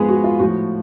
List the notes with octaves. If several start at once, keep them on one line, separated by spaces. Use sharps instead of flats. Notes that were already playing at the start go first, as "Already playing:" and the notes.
Already playing: G#2 F3 G#3 B3 G#4 B4
F#4
F4
A2 F3 F#4